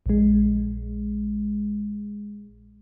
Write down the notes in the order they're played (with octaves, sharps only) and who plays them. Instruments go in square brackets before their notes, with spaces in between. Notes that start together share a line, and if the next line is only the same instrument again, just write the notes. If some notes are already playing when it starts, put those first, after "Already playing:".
[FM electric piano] A#1 G#3